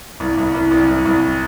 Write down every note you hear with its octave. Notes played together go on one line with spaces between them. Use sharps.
C2
C2
C2
C2
C2
C2